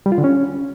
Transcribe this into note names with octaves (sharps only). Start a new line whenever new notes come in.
G3
F4
D3
C#4